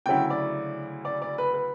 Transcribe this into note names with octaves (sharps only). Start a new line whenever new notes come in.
D2 C#3 F#3 C#4 E4 G5
D5
D5
D5
B4
B4